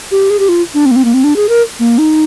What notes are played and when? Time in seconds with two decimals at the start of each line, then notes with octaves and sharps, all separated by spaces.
0.11 G4
0.30 G#4
0.39 G4
0.49 F4
0.74 D4
0.86 C4
0.91 A#3
0.96 C4
1.05 A#3
1.14 C4
1.24 D4
1.36 G#4
1.49 A#4
1.79 A#3
1.98 D#4